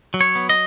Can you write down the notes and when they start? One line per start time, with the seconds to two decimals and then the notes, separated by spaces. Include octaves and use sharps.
0.14 F#3
0.21 C#5
0.35 B3
0.49 D#5